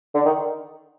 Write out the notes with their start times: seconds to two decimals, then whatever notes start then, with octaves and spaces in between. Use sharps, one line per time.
0.15 D3
0.26 D#3